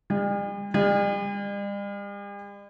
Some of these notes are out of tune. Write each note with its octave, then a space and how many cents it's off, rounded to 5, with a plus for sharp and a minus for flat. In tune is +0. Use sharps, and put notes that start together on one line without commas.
G3 +45
G3 +45